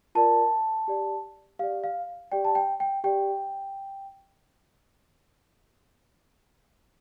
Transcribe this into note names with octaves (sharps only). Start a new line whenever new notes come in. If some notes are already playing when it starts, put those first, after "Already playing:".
F4 A#4 D5 A5
G4 D5
G4 D5 F5
F5
G4 D5 G5
A5
G5
G5
G4 D5 G5